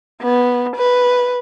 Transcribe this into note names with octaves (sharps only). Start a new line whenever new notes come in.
B3
B4